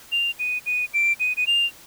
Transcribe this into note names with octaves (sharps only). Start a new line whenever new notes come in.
F7
D#7
D#7
D7
D#7
D#7
F7